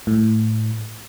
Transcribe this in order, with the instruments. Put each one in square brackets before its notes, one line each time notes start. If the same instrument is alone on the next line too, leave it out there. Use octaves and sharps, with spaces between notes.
[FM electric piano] A2